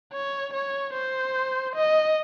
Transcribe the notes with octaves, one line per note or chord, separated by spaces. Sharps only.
C#5
C#5
C5
D#5